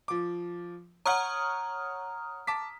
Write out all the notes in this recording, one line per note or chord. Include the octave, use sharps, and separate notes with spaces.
F3 D6
C#5 F#5 A#5 D#6 F6
A5 D6 B6